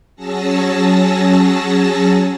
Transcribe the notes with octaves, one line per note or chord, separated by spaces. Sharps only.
F#3 C#4 G#4 A5 E6 A#6